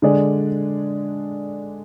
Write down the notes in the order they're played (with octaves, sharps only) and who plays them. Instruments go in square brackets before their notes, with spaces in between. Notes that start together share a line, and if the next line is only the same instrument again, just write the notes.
[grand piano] D3 G#3 D4 G#4 D5